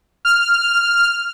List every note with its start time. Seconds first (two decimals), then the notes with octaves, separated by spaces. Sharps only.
0.25 F6